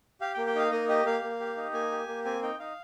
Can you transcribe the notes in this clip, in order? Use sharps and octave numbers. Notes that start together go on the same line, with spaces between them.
G4 F5
A#3 G5
G5
D#4 F5
A#3 D#5
G4 D#5
A#3 F5
A#3
G4
D#4
A#3 G#5
G4
A#3
C4 G#5
D#4 G5
D#4 F5